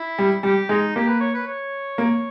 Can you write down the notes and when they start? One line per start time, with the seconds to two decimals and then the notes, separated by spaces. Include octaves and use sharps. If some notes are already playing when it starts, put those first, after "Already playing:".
Already playing: E4
0.19 G3
0.43 G3 G4
0.69 G#3 D#4
0.96 A#3 G4
1.08 B4
1.21 C#5
1.34 B4
1.47 C#5
1.98 A#3